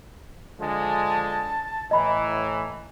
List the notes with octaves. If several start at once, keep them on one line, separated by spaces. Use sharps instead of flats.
D3 F3 G#3 A5
A2 E3 D#5 A#5 B5